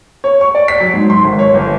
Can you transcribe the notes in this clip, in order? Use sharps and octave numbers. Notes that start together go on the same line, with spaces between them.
C#5
C#6
D5
B6
F#3
G#2
C6
G#1
C#5
G1